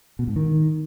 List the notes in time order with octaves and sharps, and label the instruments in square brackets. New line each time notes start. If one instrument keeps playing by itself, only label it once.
[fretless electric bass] B2
G#2
D#3